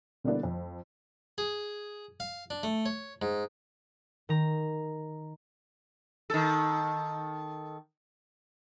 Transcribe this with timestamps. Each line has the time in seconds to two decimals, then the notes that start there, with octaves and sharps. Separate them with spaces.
0.24 D3 G3 A#3 B3 D4 E4
0.43 F2
1.38 G#4
2.20 F5
2.50 D4
2.63 A3
2.86 C#5
3.22 G#2
4.29 D#3 A#5
6.30 D#3 A4